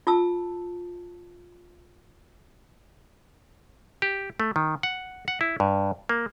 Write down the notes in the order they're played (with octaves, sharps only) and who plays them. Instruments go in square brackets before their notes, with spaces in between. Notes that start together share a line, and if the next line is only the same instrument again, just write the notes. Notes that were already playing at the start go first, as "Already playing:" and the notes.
[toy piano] F4 A5 E6
[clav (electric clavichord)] G4
A3
D#3
F#5
F#5
E4
G2
A#3